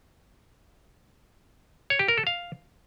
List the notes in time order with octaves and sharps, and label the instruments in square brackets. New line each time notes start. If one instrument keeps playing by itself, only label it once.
[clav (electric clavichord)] C#5
G4
A#4
A4
F5